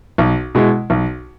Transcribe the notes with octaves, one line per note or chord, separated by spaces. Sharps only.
B1
B2 G#3 E4
B1